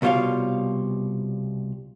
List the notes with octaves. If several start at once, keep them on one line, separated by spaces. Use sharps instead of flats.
C2 B2 G3 F4 C#5 F5